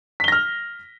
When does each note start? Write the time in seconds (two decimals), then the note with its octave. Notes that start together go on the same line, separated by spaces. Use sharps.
0.20 B6
0.24 G7
0.28 A#6
0.32 F6